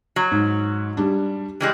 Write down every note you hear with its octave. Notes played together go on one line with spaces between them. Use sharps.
F#3
G#2
G3 D4
E3 G3 G#3